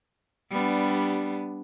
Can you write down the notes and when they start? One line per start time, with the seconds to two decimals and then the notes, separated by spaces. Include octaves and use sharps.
0.51 G3 B3 D4